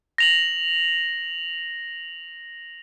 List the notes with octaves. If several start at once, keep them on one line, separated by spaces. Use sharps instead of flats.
A#6 F7 F#7